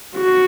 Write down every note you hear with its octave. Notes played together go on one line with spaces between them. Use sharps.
F#4